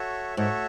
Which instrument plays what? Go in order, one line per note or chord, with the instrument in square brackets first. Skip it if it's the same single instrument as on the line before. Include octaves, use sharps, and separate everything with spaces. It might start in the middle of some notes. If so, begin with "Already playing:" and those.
Already playing: [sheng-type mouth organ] F#4 A4 C#5 E5
[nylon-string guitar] G#2 [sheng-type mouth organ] F#4 A4 C#5 E5